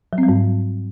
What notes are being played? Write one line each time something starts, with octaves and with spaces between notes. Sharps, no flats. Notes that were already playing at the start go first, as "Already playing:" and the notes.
F#3
C4
G3
G#2